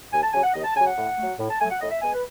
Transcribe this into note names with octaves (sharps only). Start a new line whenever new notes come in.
D#2 G#5
A5
C#3 F#3 G#5
F#5
D#2 D#5
A5
C#3 F#3 G#5
F#5
A2
F#3 A3
A2
A5
F#3 A3 G#5
F#5
A2 D#5
E5
G#3 B3 G#5
B4